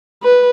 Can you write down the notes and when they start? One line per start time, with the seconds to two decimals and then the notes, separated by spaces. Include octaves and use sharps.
0.23 B4